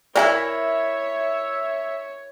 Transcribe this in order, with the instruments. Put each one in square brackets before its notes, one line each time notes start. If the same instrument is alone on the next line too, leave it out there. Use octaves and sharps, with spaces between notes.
[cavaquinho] E4 F4 A#4 [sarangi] C#5 [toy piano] D5 G#5 [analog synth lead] E5